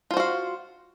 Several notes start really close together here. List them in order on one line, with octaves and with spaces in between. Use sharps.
F4 C5 F#4 F5